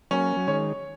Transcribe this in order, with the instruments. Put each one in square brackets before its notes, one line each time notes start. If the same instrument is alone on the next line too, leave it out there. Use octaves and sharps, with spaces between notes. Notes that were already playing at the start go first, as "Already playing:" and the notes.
[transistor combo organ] F#3 A#3 [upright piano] C#4
[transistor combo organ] F#3
[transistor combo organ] D#3 G#3 [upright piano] C#5